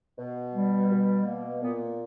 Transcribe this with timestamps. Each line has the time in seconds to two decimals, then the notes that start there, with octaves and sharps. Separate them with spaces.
0.18 B2
0.54 G3
0.90 B2
1.26 A#3
1.61 A#2 B3